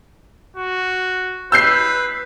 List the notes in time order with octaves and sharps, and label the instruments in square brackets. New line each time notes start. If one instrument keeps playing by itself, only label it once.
[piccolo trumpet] F#4
[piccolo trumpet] B4 [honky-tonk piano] E6 G6 C7